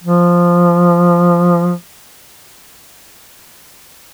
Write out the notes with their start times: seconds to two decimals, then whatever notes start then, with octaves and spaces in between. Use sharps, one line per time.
0.04 F3